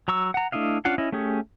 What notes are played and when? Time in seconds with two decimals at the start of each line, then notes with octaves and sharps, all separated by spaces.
0.08 F#3 A#5 C#6 E6
0.34 F#5 A#5
0.52 A3 D4 E4 D#5 F5
0.85 C#4 D4 F4 F5 F#5
0.98 C#4 E4 D#5
1.12 A3 C#4 G4 G#4